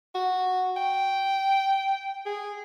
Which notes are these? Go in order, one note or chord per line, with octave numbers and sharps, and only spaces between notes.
F#4
G5
G#4